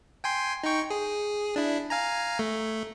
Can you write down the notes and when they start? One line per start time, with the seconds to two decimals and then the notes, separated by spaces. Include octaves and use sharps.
0.24 G5 G#5 C6
0.64 D#4 G5 C#6
0.90 G#4
1.56 D4 E4
1.90 F5 G#5 A#5
2.39 A3